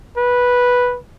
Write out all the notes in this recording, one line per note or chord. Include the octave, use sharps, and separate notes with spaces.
B4